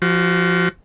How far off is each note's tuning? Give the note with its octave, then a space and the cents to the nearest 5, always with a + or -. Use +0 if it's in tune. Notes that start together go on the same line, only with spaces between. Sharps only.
F3 +0 F#4 +30